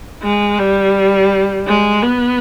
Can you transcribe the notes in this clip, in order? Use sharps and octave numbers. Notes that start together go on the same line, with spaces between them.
G#3
G3
G#3
B3